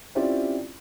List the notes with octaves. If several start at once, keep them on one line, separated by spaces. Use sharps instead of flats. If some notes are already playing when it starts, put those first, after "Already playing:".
C4 C#4 E4 F4 G4 D5